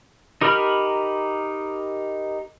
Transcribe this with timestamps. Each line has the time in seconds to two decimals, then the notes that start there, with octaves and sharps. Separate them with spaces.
0.41 D#4 G4 A#4 B5 F6